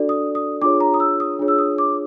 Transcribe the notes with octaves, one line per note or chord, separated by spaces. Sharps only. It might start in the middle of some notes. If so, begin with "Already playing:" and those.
Already playing: D4 F#4 A4 D5
D#6
D#6
D4 F4 G#4 C#5 D6
A#5
D#6
E6
D#6
D4 F4 G#4 C#5
E6
D#6
D6